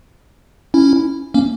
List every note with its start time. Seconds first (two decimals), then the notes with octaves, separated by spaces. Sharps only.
0.74 C#4 E4
1.34 A#3 C#4